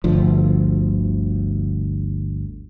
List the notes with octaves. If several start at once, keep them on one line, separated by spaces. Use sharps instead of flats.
G1 D2 F3